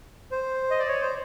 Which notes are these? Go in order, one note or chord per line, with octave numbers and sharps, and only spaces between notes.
C5
D#5
D5
C#5
C5